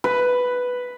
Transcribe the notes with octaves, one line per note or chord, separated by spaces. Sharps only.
B4